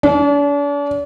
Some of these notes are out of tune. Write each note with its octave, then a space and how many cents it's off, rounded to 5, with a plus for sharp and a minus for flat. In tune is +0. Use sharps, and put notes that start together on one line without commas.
D4 -40